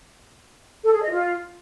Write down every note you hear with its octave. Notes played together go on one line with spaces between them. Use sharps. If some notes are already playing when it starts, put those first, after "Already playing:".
A4
G#4
D#5
F4